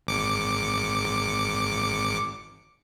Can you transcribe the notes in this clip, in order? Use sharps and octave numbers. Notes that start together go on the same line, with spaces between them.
G#1 D6 C#7